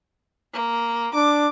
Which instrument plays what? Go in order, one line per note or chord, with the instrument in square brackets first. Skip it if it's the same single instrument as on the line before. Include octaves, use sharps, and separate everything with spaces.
[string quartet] A#3
[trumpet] D4 [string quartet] D6